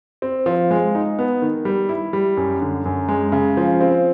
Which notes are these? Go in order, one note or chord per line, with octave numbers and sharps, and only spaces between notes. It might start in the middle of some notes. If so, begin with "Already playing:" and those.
C4
F3
G#3
D#4
B3
D#3
G3
E4
G3
F#2
D3
F#2
G#3
C#3
F3
C4